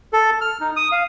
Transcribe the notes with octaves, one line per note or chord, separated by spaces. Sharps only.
A4
F6
D#4
D#6
F5